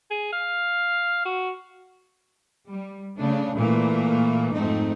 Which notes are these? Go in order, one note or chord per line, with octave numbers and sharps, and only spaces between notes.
G#4
F5
F#4
G3
C#3 A3 D4
A#2 E3 A3 A#3
F2 G#2 A3 C4 D#4